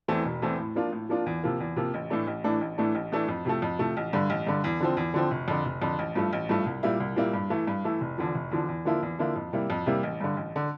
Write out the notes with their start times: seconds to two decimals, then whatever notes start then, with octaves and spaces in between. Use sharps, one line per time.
0.08 E2 E3 A3 C4
0.25 E1
0.42 E2 E3 A3 C4
0.59 A2
0.75 F3 A#3 D4 F4
0.92 A2
1.09 F3 A#3 D4 F4
1.26 E2
1.43 C3 F3 A#3
1.60 E2
1.76 C3 F3 A#3
1.94 A1
2.10 A2 E3 A3 D4
2.27 A1
2.44 A2 E3 A3 D4
2.61 A1
2.78 A2 E3 A3 D4
2.95 A1
3.12 A2 E3 A3 D4
3.28 F2
3.45 C3 F3 A3
3.62 F2
3.79 C3 F3 A3
3.97 A1
4.13 G2 D3
4.30 A1
4.47 G2 D3
4.64 E2
4.80 D3 F3 C4
4.97 E2
5.14 D3 F3 C4
5.31 F1
5.48 F2 D3
5.65 F1
5.82 F2 D3
5.99 A1
6.15 G2 F3 A3
6.33 A1
6.49 G2 F3 A3
6.66 C2
6.83 A#2 G3 A#3 E4
7.00 C2
7.16 A#2 G3 A#3 E4
7.33 G2
7.50 E3 A3 E4
7.67 G2
7.84 E3 A3 E4
8.01 F1
8.18 E2 D3 F3
8.35 F1
8.51 E2 D3 F3
8.68 E2
8.85 D3 F3 A#3 E4
9.03 E2
9.19 D3 F3 A#3 E4
9.36 F2
9.53 C3 G3 A#3 E4
9.70 F2
9.86 C3 G3 A#3 E4
10.03 A1
10.20 G2 D3
10.37 A1
10.56 D3